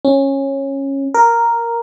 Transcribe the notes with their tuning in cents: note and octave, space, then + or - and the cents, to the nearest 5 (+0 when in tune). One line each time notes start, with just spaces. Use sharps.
C#4 -15
A#4 +0